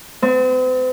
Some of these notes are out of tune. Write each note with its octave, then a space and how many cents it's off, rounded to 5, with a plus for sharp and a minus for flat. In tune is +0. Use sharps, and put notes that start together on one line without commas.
C4 -45